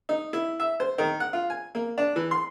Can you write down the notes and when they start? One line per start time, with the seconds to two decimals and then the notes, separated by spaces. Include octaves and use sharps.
0.09 D#4
0.33 E4
0.60 E5
0.80 C5
0.98 D#3
1.20 F#5
1.33 F4
1.50 G#5
1.75 A#3
1.98 D4
2.16 E3
2.31 C6